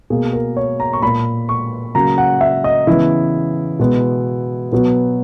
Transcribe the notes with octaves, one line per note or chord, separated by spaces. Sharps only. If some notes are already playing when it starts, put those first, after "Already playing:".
B2 A#3 G#4
A#4
C#5
A#5
C#6
A#2 A#3 B5
C#6
C#3 F#3 A#3 A#5
F#5
E5
D#5
C#3 E3 B3 E4
B2 G#3 B3
B2 F#3 B3